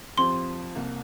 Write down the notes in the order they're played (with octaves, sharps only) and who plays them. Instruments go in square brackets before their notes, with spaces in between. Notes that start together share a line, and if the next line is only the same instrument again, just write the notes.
[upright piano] F2 F3 C4 G4 [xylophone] C6
[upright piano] C2 C3 A#3